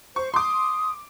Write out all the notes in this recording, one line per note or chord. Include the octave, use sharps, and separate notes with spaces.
C5 C#6
C6 D6 D#6